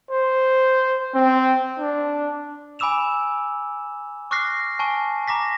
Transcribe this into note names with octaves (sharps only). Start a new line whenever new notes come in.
C5
C4
D4
G#5 B5 D6 E6 E7 F7
C#6 D6 F6 F#6 A#6 C7
G#5 A5 C#6
A#5 D6 A#6 B6